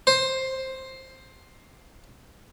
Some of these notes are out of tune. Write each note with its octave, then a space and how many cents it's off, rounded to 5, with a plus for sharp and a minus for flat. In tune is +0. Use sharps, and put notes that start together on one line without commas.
C5 +10